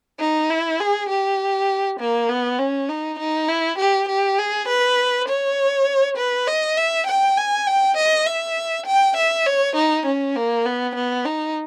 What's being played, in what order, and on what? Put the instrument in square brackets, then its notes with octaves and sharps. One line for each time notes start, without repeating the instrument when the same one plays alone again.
[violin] D#4
E4
G#4
G4
A#3
B3
C#4
D#4
D#4
E4
G4
G4
G#4
B4
C#5
B4
D#5
E5
G5
G#5
G5
D#5
E5
G5
E5
C#5
D#4
C#4
A#3
B3
B3
D#4